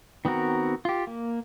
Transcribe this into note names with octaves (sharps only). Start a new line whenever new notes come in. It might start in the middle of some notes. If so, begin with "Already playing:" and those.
D#3 B3 C4 F#4 A#4
F4 G4
A#3